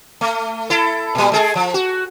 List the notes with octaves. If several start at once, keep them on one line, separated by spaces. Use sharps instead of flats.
A3
E4 A4
A#2 G3
G#3 G#4 A4
F3
F#4